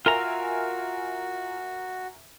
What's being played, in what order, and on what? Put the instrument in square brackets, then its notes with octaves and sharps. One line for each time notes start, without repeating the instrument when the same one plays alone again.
[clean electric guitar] F4 A#5 [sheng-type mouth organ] F#4 [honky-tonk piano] A#4 E5 G#5